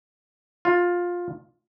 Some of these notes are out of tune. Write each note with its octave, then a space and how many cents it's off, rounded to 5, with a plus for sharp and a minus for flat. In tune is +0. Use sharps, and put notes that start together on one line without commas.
F4 +15